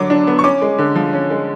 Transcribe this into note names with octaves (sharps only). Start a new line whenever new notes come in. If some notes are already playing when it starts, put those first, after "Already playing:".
Already playing: D3 F#3 D6
D4
B3
C#6
C#4 D6
G#3
D3
F3
C#4
G#3